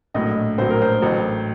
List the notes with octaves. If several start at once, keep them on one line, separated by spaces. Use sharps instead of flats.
A#1 A2 F#3 D#5
A#1 A2 F#3 C5
A#4
C5
A1 A2 F#3